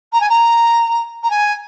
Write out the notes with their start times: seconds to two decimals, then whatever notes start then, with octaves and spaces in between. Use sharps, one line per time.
0.12 A#5
0.20 G#5
0.29 A#5
1.23 A#5
1.30 G#5